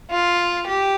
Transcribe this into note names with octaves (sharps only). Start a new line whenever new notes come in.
F4
G4